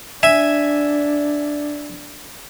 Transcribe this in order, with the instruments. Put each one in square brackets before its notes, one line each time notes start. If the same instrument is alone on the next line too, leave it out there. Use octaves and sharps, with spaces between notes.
[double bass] D4 [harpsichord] E5 G#5